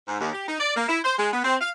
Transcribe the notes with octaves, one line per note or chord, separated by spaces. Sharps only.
G#2
D#2
G4
D#4
D5
A#3
E4
C5
G#3
B3
C4
F5